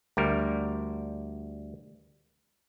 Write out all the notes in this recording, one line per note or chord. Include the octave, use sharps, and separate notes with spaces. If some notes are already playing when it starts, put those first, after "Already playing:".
D2 G3 A#4